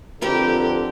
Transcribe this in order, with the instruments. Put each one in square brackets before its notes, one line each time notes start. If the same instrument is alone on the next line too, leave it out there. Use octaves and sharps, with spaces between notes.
[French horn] F2 [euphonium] D3 [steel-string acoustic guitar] C4 A#4 B4 [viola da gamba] G4